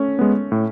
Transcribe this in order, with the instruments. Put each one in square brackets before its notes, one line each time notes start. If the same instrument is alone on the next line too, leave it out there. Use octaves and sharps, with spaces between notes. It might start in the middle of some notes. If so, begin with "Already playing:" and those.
Already playing: [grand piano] A3 C#4
[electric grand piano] G#3 B3
A2